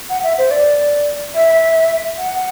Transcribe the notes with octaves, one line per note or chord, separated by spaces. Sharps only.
F#5
E5
C5
D5
E5
F#5